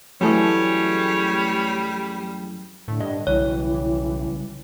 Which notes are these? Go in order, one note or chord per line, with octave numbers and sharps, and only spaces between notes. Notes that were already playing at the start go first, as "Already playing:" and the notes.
F#2 E3 F#3 G3 A3 G#4 C#5
A2 D3
G2 D#5
B1 C#3 E3 G3 C#5